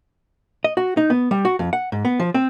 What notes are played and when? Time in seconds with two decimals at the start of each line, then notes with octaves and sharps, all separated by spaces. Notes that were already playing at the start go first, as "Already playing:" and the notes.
0.64 D#5
0.77 F#4
0.97 D#4
1.10 B3
1.31 G3
1.45 F#4
1.59 F2
1.73 F#5
1.92 G#2
2.05 B3
2.20 F3
2.34 C4